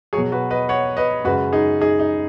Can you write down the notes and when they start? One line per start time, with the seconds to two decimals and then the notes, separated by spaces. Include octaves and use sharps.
0.13 B2 F#3 G#4 C#5
0.32 F#4 B4
0.51 B4 D#5
0.69 C#5 F#5
0.97 B4 D#5
1.24 F#2 C#3 G#3 F#4 B4
1.53 D#4 G#4
1.81 D#4 G#4
2.00 D#4